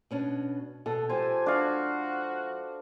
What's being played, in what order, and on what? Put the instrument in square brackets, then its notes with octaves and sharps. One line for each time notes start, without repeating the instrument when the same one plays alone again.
[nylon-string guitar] B2 C#4 D4
[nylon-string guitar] B2 [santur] A4
[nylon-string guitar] F3 G#3 [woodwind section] G4 G#5 [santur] C5
[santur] D4 F5 [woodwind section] F#4